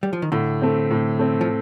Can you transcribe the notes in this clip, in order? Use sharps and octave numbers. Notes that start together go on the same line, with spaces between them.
G3
F3
D#3
A2 D3
A3 C4
A2
A3 C4
F3